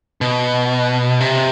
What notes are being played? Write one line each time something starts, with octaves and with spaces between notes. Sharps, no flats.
B2
C3